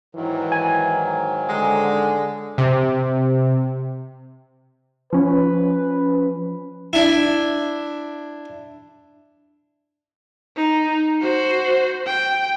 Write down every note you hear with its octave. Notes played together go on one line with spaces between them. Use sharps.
G#2 D#3 E3 F#3
G#5
D3 G#3
C3
F3 C#4 B4
D4 E4
D#4
F#4 C5
G5